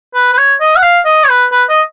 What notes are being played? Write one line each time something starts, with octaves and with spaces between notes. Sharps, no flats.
B4
B4
C#5
D#5
F#5
F5
D#5
C#5
B4
B4
D#5